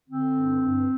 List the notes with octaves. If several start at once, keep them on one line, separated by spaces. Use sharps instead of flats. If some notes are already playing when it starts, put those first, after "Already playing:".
D3 C4
G2
G2